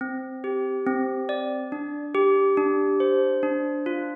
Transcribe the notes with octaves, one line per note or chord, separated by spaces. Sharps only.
C4
G4
C4
D5
D4
G4
D4
C5
D4
F4